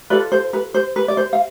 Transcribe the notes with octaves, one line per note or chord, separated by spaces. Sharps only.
F4 A4 B4 D5
C5
B4
C5
B4
D5
C5
F5